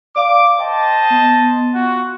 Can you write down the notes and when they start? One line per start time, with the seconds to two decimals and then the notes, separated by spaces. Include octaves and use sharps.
0.16 D5 F5 D6
0.60 C5 D#5 G5 A5
1.10 B3
1.73 F4 F#4